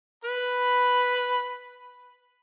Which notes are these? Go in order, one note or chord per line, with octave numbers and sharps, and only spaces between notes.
B4 B5